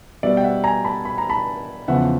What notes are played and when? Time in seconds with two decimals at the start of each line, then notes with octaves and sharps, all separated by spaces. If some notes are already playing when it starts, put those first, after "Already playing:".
0.23 B2 G3 D5 E5
0.37 G5
0.43 E5 F#5
0.64 G#5 A#5
0.84 A5 B5
1.05 B5
1.18 A#5
1.30 A5 B5
1.88 E2 C#3 F3 E5 F#5